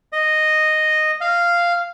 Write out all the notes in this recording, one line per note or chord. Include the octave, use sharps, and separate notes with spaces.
D#5
F5